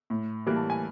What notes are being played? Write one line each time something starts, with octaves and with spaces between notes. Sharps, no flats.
A2
E3 G3 A#3
A5
G#5